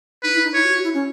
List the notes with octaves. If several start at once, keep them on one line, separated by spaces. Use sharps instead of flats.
D#4 B4
E4
D#4
E4 C#5
F#4
F#4
E4
C#4